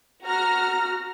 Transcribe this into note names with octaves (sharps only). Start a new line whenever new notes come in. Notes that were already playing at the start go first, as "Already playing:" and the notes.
F#4 A#5 F6 A#6